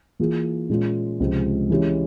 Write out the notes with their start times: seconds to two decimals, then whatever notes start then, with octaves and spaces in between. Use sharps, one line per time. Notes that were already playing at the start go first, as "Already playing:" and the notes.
0.19 E3 A#3 F4 G#4
0.70 A#2 G#3 C#4 F4
1.20 C#2 C3 F3 G#3 C4
1.70 E3 G#3 C#4 G4